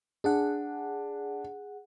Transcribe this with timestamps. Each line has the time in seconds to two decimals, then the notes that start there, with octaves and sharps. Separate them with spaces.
0.24 D4 G#4 F#5